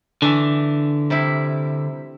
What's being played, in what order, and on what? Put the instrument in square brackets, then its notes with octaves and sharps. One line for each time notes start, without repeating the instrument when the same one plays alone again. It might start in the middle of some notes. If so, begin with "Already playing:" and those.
[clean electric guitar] D3 [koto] E3 A3 D4
[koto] C3 G3 E4